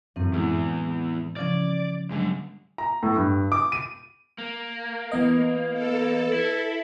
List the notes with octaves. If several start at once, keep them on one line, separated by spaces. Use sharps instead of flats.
F#2 A2 E3 C4
E2 E3 G#3 E4 F6
C#3 F3 C#4 D5 G#6
G2 D3 F#3 G#3
A#5
A2
G2
D6
D#7
A#3
E3 B3 B4 D#5
A4
E4